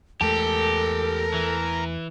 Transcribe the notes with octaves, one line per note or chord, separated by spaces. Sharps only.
E2 G#3 A3 G4 A4 A#4 A5
E3